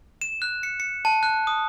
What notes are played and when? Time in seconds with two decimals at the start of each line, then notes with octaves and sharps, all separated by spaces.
0.21 E7
0.42 F#6
0.63 C#7
0.80 C#7
1.05 A5
1.23 F#6
1.47 D#6